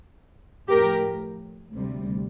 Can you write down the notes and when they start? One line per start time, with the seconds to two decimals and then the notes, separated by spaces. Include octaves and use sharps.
0.68 A2 F3 G4 A#4
1.71 D2 C3 G3